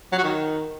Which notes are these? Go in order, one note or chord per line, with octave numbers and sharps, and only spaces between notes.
F#3
F#4
D#3